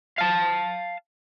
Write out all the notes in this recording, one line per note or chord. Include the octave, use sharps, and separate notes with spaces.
F5 A5